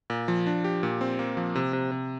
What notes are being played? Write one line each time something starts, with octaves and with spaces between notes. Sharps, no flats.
A#2
F3
D4
G4
A#2
C4
A#3
F3
C3
C3
C3